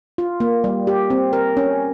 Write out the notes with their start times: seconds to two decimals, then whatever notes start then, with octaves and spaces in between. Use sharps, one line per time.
0.18 F4
0.40 A#3
0.64 G3
0.87 G4
1.10 C4
1.33 A#4
1.57 C#4